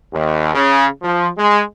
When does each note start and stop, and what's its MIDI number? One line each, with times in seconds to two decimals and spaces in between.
0.13 0.54 39
0.54 0.85 49
1.02 1.27 53
1.38 1.61 56